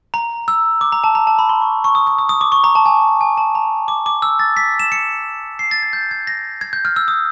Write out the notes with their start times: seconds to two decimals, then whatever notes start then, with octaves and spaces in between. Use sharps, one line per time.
0.14 A#5
0.48 E6
0.81 D6
0.92 A#5
1.04 A5
1.15 A#5
1.27 A5
1.39 B5
1.49 C6
1.62 C#6
1.84 C#6
1.95 D#6
2.07 D#6
2.19 D#6
2.29 D#6
2.41 D6
2.52 C#6
2.64 A#5
2.75 A5
2.86 G#5
3.21 G#5
3.37 A5
3.55 A#5
3.88 D6
4.06 D6
4.22 E6
4.39 A6
4.57 B6
4.80 E7
4.92 C#7
5.59 C7
5.71 A6
5.83 G#6
5.93 G6
6.11 G#6
6.27 A#6
6.61 G#6
6.73 G6
6.85 F6
6.96 E6
7.08 D#6